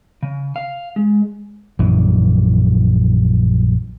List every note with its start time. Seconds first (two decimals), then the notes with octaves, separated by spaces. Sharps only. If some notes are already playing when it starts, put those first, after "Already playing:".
0.22 C#3
0.56 F5
0.96 G#3
1.79 A#1 F#2 E3